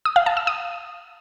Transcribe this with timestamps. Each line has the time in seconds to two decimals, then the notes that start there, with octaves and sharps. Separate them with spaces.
0.05 D#6
0.16 F5
0.26 A5
0.37 E6
0.47 D#6